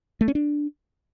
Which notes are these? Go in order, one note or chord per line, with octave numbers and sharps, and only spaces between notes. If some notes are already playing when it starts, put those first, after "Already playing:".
A3
C#4
D4